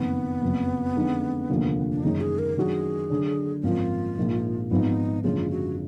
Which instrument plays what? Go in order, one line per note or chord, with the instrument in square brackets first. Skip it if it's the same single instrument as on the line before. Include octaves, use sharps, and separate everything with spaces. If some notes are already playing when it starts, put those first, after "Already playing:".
Already playing: [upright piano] F#1 F2 D#3 [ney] B3
[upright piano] F#1 F2 F3
F2 D3 G#3 D#4
F1 D#2 D3 F3 A#3
[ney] D4
[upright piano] F#1 F#2 D#3 G#3 [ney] D#4
[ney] G#4
A#4
[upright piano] F#2 D#3 F#3 D4 F#4 [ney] G#4 A#4
[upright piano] D3 F#3 D4
[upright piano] G#1 F#2 F3 A#3 [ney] F4
[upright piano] A#1 G#2 F3 A#3
[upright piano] G#1 G#2 F3 B3 F4 [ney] D#4
[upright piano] F#1 F#2 D3 F3 G#3 [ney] F4
[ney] F#4